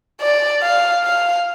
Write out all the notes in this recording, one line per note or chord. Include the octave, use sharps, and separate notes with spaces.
D5
F5
F5